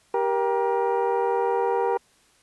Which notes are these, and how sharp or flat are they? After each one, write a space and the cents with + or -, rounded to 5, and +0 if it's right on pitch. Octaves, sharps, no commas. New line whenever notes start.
G4 +5 A#4 +25